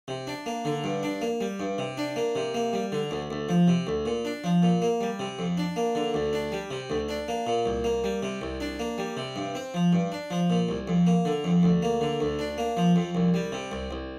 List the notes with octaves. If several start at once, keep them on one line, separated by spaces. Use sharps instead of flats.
C3
D4
A#3
D3
G2
D4
A#3
G3
G2
C3
D4
A#3
C3
A#3
G3
D3
D2
D2
F3
C3
D2
A#2
D4
F3
A#2
A#3
G3
C3
F2
D4
A#3
D3
D2
D4
G3
C3
D2
D4
A#3
A#2
C2
A#3
G3
C3
C2
D4
A#3
G3
C3
G2
C4
F3
G2
D4
F3
A#2
C2
F2
A#3
D3
F2
D2
A#3
D3
D2
D4
A#3
F3
F2
C2
G3
C3
C2
C2